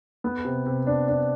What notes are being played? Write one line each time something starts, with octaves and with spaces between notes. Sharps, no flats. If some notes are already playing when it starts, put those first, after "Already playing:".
B3
C3
C3
D4
D4